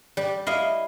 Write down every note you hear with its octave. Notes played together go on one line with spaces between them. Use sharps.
G3
E4 D#5 F5